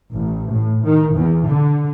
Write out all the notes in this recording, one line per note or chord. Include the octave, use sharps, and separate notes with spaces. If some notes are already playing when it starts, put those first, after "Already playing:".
A1
A2
D#3
E2
D3